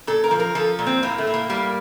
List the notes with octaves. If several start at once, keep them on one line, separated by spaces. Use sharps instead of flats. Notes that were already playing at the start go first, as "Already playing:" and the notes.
A#2 A4
A#4
F3
A#4
F3 A4
A#2
C4
A2 A#3
A3
A2
A#3
G3 A#3